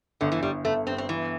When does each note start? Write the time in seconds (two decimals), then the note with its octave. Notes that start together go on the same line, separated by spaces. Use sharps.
0.21 G1 D3
0.32 E3
0.42 G1 G3
0.65 G1 A3
0.87 G2 C4
0.98 C4
1.09 E3 B3